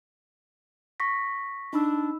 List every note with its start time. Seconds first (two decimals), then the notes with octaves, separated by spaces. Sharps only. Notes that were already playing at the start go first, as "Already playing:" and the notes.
1.00 C#6 A#6 B6
1.73 D4 D#4 B5 E6